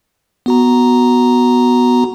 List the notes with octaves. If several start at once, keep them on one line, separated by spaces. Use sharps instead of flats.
B3 F#4 A#5